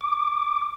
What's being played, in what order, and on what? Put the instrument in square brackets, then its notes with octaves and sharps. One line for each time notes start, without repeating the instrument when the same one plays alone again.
[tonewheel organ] D6